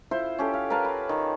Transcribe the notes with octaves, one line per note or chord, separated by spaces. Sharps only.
E4 F4 C5
C#4 G4 A4
F5
A#4 B4 F5 A5
B5
D#3